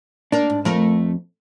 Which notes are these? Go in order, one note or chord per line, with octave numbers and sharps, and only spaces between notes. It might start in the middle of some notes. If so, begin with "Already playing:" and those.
A#3 D4 A#4
G#2
F2 A3 A#4